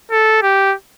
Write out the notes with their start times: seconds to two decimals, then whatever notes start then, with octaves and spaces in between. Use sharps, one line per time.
0.11 A4
0.42 G4